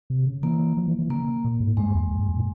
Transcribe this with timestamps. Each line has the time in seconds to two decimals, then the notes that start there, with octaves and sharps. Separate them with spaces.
0.10 C3
0.27 C#3
0.43 E3 A#3
0.77 F3
0.88 E3
0.99 E3
1.10 C#3 A#3
1.44 A#2
1.60 G#2
1.77 G2 G#3
1.94 E2
2.11 F2
2.19 G2
2.28 F2
2.37 A#2